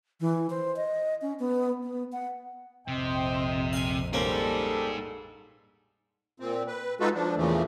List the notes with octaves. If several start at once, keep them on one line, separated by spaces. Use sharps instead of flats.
E3
C5
D#5
C#4
B3
B3
F#5
A#1 F2 C3 C5 D#5 G5
F5 G#5
G3 A#3 C4 C#4 D#4 G#4 A4
A#2 C4
B4
G#3 D#4 F4 F#4 A4 B4
F3 D4
E2 A#2 C#3 E3 F3 A3